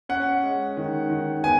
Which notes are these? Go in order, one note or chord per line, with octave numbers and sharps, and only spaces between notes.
C#4 F#5
G#3
D#3
D#3
B3 G#5